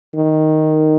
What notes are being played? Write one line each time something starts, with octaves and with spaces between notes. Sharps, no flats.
D#3